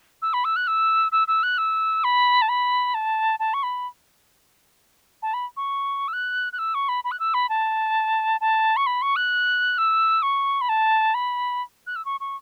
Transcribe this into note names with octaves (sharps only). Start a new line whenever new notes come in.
E6
B5
E6
F#6
E6
E6
E6
F#6
E6
B5
A5
B5
A5
A5
C#6
B5
A5
B5
C#6
E6
F#6
F#6
E6
C#6
B5
B5
F#6
E6
B5
A5
A5
C#6
B5
C#6
F#6
E6
C#6
B5
A5
B5
F#6
E6
C#6
C#6